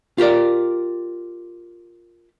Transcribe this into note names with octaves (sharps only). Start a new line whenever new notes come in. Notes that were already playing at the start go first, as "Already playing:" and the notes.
F4 G4 A#4 D5